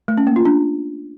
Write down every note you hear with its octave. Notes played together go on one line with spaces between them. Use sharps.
A3
C#4
A#3
F4
D4